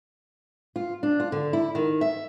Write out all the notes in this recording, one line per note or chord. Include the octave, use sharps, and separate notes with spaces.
F4
D4
F4
D3
E4
D#3
E5